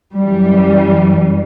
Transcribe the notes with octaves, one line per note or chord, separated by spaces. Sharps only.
F#2 E3 G3